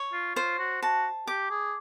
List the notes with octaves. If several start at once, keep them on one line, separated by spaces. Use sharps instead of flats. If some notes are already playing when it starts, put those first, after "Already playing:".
Already playing: C#5
F4
F4 C5
F#4
F#4 A5
G4 D6
G#4